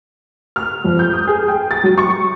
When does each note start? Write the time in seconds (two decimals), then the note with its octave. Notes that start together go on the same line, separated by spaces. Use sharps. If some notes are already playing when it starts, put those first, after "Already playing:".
0.56 F6
0.84 F2
0.99 G6
1.13 D#6
1.27 G#4
1.48 G5
1.71 A6
1.84 F#3
1.98 C#6